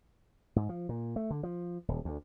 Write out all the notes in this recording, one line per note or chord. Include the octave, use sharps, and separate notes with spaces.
G#2
F3
A#2
A3
D3
F3
D#1
D2